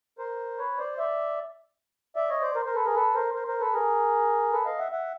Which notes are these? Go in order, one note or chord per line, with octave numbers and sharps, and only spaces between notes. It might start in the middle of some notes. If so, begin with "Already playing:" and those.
A#4 C5
B4 C#5
C5 D5
D5 E5
D5 E5
C#5 D#5
C5 D5
A#4 C5
A#4 C5
A4 B4
G#4 A#4
A4 B4
A#4 C5
A#4 C5
A#4 C5
A4 B4
G#4 A#4
A4 B4
D#5 F5
E5 F#5
E5 F#5